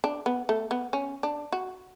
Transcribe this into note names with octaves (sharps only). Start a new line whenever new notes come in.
D4
B3
A3
B3
C#4
D4
F#4